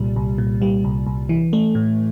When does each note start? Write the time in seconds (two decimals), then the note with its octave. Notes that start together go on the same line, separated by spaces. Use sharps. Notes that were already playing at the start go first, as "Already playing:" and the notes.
Already playing: C2 A#2 G3
0.16 C2
0.38 A#2
0.62 G3
0.84 C2
1.07 C2
1.29 E3
1.53 A3
1.75 A2